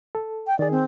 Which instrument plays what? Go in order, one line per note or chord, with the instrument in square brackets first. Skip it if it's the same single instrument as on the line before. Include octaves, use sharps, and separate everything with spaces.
[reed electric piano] A4
[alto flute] G5
[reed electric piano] D#3 G#4 [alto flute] D5
[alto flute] C4